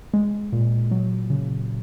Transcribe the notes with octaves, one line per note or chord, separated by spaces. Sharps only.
G#3
A#2
F#3
C#3